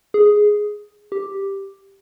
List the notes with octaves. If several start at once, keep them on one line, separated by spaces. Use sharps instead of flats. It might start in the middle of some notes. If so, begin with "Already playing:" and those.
G#4
G4